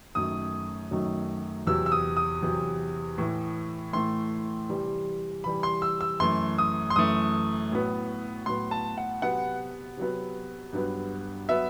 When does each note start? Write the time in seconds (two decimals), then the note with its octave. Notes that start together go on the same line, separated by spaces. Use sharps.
0.15 F#2 D#3 F#3 A3 D#6
0.91 F#2 D#3 F#3 A3
1.67 E2 C3 F#3 E6
1.86 E6
1.92 D#6
2.17 D#6
2.43 E2 C3 F#3
3.18 A2 E3 A3
3.93 A2 E3 A3 C6
4.69 C3 E3 G3
5.44 C3 E3 G3 B5
5.63 C6
5.82 E6
6.01 E6
6.20 F#2 E3 A3 C6
6.58 D#6
6.90 C6
6.96 F#2 E3 A3 D#6
7.72 A2 F#3 B3
8.46 A2 F#3 B3 C6
8.71 A5
8.98 F#5
9.22 C3 F#3 B3 F#5
9.97 C3 F#3 B3
10.73 G2 F#3 B3
11.49 F#3 B3 E5